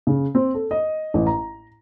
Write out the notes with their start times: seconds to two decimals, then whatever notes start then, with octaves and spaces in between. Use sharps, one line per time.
0.07 C#3
0.35 C4
0.54 A4
0.71 D#5
1.14 A1
1.27 A#5